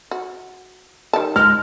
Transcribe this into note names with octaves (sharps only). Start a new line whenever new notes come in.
F#4
D#3 G3 A5
G#3 F6